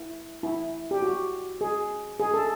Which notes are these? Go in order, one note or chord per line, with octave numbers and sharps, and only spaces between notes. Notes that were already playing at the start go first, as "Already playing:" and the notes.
Already playing: E4
E4
G4
F#4
G#4
G#4
A4